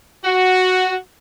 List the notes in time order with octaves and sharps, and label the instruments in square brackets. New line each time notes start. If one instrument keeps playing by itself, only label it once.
[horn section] F#4